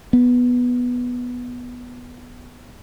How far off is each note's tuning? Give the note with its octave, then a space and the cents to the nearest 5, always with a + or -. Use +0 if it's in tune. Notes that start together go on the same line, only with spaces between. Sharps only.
B3 -5